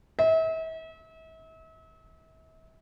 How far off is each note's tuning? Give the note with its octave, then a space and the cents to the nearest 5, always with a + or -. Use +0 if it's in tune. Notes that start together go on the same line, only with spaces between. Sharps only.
E5 -40